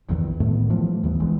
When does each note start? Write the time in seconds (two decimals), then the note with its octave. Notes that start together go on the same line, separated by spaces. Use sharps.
0.09 A#1 E2 D#3 E3
0.40 A2 D#3 A3 B3
0.70 E3 F3 G3 A3
1.03 D#2 E3 B3
1.20 A#1 E3 G#3